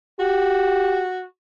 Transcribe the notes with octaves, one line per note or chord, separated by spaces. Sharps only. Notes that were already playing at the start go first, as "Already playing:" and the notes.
F#4 G4